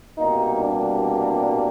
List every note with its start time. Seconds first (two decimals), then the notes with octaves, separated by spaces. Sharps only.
0.18 C2 B2 G3 A#3 D#4
0.60 D4